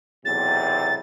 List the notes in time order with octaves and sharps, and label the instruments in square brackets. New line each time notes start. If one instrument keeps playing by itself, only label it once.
[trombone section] B1 E2 C3 [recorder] A6